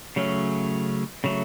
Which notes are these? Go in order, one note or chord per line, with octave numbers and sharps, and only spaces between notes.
C#3 F#3 A3 C#4
C#3 F#3 A3